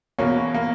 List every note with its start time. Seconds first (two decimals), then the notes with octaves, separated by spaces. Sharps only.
0.19 E2 B2 A#3 C#4
0.54 A#3